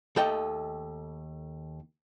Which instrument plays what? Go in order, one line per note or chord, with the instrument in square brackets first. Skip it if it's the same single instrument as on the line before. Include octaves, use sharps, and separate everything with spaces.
[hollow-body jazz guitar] D#2 A3 A4 D#5 G5